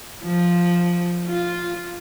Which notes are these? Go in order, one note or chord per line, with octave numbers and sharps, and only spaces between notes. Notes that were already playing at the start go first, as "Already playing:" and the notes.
F3
F4